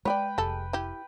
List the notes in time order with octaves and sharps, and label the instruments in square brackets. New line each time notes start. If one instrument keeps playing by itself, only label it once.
[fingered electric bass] G#3 [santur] B4 G5 [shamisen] C#5 D5
[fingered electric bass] F1 [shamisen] G3 G#3 A4
[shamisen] E4 G4